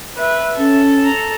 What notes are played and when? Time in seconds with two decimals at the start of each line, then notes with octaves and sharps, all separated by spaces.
0.17 B4 E5
0.57 C#4 A4
1.05 A#5